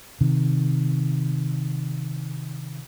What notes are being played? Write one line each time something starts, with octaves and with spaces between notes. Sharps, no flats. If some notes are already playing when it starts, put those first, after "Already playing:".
C3 D#3